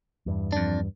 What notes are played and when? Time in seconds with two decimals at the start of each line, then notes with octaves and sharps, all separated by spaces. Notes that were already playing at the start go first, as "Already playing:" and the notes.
0.26 E2 G2
0.52 F2 D4